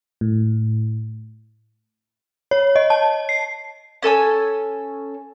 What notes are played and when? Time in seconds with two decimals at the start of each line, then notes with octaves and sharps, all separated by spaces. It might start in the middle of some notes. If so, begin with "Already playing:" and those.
0.21 A2
2.51 C#5
2.76 D#5
2.90 A5
3.29 C7
4.02 C#4 A4 G#5 E6